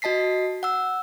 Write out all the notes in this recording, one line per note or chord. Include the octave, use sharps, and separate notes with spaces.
F#4 D#5 A5 B6 C7
F#5 E6